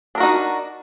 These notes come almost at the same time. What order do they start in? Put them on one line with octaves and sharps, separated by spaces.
D4 A#4 F#4 D#4